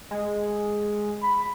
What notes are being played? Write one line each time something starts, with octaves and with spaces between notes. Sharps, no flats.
G#3
B5